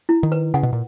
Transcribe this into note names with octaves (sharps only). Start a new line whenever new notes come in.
E4
D#3
B4
C#3 F#5
B2
A#2